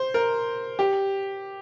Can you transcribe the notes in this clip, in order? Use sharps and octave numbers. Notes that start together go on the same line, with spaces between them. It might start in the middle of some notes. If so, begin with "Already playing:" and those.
Already playing: C5
A#4
G4